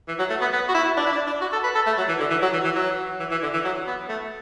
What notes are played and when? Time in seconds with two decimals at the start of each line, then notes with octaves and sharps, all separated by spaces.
0.08 E3
0.19 F#3
0.30 A3
0.41 B3
0.53 B3
0.69 F#4
0.75 E4
0.97 D4
1.06 E4
1.12 D4
1.27 D4
1.41 F#4
1.53 A4
1.64 B4
1.75 A4
1.86 A3
1.98 F#3
2.09 E3
2.20 D3
2.31 E3
2.42 F#3
2.53 E3
2.65 E3
2.75 F#3
3.20 E3
3.31 E3
3.42 D3
3.54 E3
3.65 F#3
3.87 B3
4.09 A3